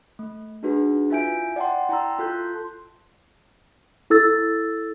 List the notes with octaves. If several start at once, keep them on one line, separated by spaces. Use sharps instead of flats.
A3
D4 D#4 F#4 G#4 B4
E4 F4 E5 G#5 G6 D7
D5 F#5 G5 A5 C6
E4 G5 A5 A#5 C6 E6
F4 A4 A5 C6 F#6 G6
E4 A4 E6 A6